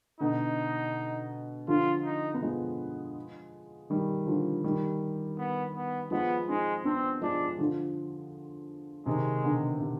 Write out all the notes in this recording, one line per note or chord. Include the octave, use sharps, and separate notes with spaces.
B2 D3 D#4
D3 F3 F4
D#4
B3
F3 G#3
D#3 G3
D3 F3
D#3 G3
B3
B3
F3 G#3 B3
G#3 C4 D#4
B3 C4 D4
F3 G#3 D4
D3 F3
C3 D#3 G#3
B2 D3
C3